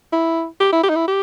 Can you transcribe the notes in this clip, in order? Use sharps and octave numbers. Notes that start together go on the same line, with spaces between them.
E4
G4
E4
G4
D#4
E4
G4